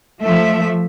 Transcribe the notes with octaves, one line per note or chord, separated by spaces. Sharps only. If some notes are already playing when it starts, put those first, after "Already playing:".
F3 A3 E5